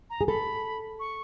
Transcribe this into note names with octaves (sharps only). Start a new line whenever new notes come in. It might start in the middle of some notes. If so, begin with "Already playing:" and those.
A#5
G#4
A4 B5
C#6